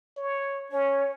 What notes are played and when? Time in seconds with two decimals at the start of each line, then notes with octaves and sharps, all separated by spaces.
0.17 C#5
0.72 C#4 C#5